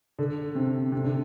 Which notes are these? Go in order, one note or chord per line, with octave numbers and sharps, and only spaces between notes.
D3
C3
C3
D3